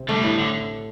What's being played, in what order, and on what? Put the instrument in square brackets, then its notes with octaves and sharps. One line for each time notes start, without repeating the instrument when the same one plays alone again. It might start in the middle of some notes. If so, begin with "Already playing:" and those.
Already playing: [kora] C3
[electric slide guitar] D3 G3 [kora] A3
[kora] A2
[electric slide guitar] D3